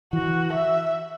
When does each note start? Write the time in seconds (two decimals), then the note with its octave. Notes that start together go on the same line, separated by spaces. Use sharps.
0.13 E3 F#4
0.53 E5